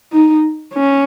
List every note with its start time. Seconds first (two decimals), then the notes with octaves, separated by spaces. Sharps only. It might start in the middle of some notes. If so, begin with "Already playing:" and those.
0.13 D#4
0.74 C#4